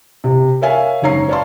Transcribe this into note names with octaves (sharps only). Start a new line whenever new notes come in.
C3
A#4 C#5 E5 F5 G#5
F#1 G#2 C#5 A#5 C7
B4 C#5 D5 F5 A5 C6